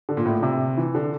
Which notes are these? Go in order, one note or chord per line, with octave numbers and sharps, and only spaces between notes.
D3
A#2
A2
A#2
C3
E3
D3